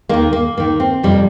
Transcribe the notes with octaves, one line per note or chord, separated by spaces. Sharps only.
D#2 D#3 A#3
A#3
D#2 D#3 A#3
C4
F2 C3 F3 G3